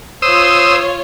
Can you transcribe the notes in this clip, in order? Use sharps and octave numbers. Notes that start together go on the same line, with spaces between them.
F4 C5 C#5 D#6 E6